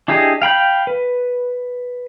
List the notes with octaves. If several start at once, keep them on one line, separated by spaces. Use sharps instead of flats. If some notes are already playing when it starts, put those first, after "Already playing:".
D4 E4 G4 G#4 D#5
F5 G5 B5 G6
B4